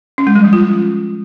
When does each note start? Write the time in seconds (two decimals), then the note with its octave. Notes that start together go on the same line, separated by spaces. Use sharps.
0.18 C#4
0.27 G#3
0.35 G3
0.44 F3
0.53 F4